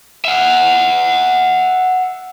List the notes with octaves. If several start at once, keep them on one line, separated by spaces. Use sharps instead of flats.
E5 F#5